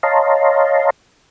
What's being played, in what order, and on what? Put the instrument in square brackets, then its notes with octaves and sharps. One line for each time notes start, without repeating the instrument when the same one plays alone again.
[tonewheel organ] C#5 D#5 F5 A5 A#5 C6